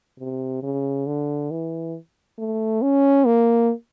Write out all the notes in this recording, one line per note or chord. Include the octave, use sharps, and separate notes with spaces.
C3
C#3
D3
E3
A3
C#4
A#3